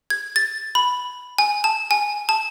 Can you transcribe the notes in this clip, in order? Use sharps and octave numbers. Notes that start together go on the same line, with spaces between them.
G#6
A6
B5
G#5
A5
G#5
A5